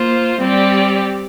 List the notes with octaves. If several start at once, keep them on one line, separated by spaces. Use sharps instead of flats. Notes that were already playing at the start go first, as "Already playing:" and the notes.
Already playing: A#3 F4 C5
G3 C4 G4 D5